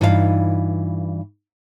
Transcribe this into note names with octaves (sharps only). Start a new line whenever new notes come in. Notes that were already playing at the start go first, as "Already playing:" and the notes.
G2 E3 D#4 F4 G#4 F5